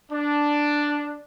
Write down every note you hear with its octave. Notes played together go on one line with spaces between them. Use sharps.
D4